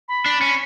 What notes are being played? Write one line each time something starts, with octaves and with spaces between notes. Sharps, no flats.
B5
D4
C#4